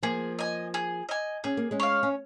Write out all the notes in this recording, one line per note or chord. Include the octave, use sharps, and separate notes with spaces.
F3 A#3 G#4
D#5 G#5
G#4
D#5 G#5
C#4 G#4
A#3
G#3 C#4
C#5 F5
C#4